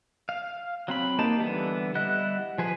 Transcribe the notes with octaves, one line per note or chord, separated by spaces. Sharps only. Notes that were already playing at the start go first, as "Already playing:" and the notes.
F5
F#3 C4 B5
A#3 D#4 G4 A5
D3 E3 G3 B3
G3 E4 D#5 F#5 F#6
F3 G#4 B4